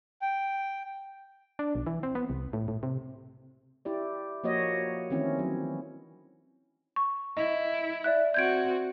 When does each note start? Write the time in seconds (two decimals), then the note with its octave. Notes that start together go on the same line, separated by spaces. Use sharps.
0.22 G5
1.59 D4
1.75 B1
1.86 E3
2.03 C4
2.15 B3
2.30 C2
2.53 A2
2.68 A2
2.83 C3
3.85 E4 G4 D5
4.44 F3 A#3 F#4 C#5 D#5
5.10 D#3 E3 A3 C4 C#4 E4
5.39 F#3
6.96 C#6
7.37 E4 D#5
8.04 D5 E5 F#6
8.34 C4 F#4 G6 G#6 D7